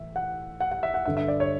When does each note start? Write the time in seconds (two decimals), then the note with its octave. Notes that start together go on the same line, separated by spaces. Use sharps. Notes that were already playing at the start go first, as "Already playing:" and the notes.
Already playing: A2 E3 E5
0.16 F#5
0.60 F#5
0.71 F#5
0.83 E5
0.94 F#5
1.05 G2 D3 E5
1.17 E5
1.28 D5
1.40 C#5